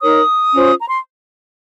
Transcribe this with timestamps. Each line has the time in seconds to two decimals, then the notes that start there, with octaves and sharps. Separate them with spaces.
0.01 D#4 A#4 C#5 D#6
0.53 C#4 F4 C5
0.80 A#5
0.89 C6